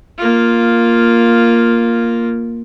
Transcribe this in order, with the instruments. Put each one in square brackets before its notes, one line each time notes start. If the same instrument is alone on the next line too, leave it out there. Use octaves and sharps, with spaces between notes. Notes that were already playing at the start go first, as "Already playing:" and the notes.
[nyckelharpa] A#3 F4